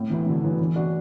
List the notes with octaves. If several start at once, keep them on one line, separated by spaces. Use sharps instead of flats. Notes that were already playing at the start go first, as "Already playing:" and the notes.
Already playing: A2
E3 B3 E4
A2 D3 F#3
E3 B3 E4
E3
D4 F#4